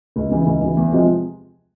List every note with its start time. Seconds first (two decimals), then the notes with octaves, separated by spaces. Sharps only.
0.16 C#2
0.31 C#3 E3
0.46 C#2
0.61 C#3 E3
0.77 E2
0.92 C3 F3 G#3